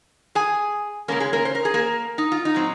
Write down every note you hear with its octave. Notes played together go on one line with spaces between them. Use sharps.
G#4 G#5
C#3 G#3 A#3 C#4 A#4
G#3 G#4
A#3 A#4
C5
A#4
G#4
A#3 A#4
D#4
F4
D#4
A#2 F#3 C4